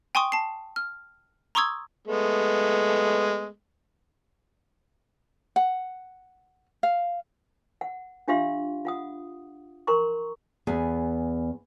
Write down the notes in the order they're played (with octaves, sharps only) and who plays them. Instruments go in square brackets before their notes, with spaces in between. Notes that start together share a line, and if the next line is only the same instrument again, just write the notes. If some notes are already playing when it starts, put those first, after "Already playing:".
[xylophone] G5 G#5 C6 C#6 D#6
A5 C7
F6
A#5 C6 C#6 D#6 E6 G#6
[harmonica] G#3 A3 B3
[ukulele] F#5
F5
[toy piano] F#5
D4 F4 G4 E5 F5 C6
F4 F#5 D#6
A#4 A#5 C6 C#6
[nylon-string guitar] E2 B3 G#4